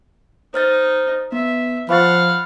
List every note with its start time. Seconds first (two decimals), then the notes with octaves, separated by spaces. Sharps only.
0.54 D#4 C5 F6 A6
1.32 B3 E5
1.89 F3 F5 F#5 B5 C#6 A6